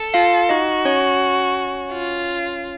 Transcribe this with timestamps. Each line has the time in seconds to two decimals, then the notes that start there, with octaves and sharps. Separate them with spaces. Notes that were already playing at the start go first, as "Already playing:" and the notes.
Already playing: A4
0.14 F4 F5
0.49 D#4 F#4 D#5
0.85 C#4 C#5
1.93 F4